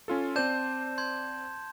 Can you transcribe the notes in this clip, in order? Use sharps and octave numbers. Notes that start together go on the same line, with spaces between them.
C#4 F4 A4
C4 C5 D5 A5 G6 E7
C6 G6 G#6